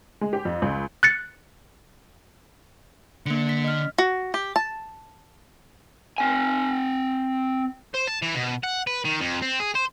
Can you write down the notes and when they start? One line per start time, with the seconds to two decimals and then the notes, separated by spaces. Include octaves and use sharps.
0.21 G#3
0.33 G4
0.45 F2
0.62 C#2
1.03 F#6 A6 C#7
3.26 D3 A#3 C#7
3.49 B6
3.64 D#5 F6
3.98 F#4
4.34 G4
4.56 A5
6.18 C4 G#5
7.94 C5
8.07 A5
8.22 E3
8.35 B2
8.64 F#5
8.87 B4
9.05 D#3
9.20 F2
9.42 C4
9.60 G#4
9.75 C5